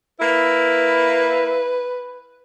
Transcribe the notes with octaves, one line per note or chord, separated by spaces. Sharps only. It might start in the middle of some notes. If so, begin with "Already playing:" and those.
A#3 E4 B4